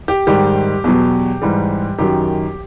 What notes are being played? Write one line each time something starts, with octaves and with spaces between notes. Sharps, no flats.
G4
G#2 D#3 G3 G4
E2 B2 F#3
G#2 E3 G3
F#2 D#3 F#3 G4